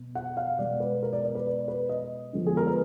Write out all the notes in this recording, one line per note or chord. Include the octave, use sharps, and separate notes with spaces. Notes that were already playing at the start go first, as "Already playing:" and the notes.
Already playing: B2
F#5
F5
B2 G#3 B3 D5
B4
A#4
D5
D5
B4
D5
B4
D#5
D3 F3 G#3 B3
G#4
A#4
B4